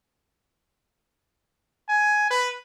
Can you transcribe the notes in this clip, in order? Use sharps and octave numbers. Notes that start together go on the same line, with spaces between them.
G#5
B4